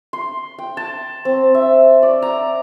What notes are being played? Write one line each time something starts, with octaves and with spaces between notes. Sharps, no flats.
C6
G5
A5
C4
E5
D5
A#5